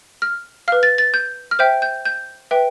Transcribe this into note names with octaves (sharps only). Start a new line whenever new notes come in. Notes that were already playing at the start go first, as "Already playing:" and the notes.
F6
B4 F5 F6
A6
A6
G6
F6
C5 E5 G5 G6
G6
G6
B4 E5 G5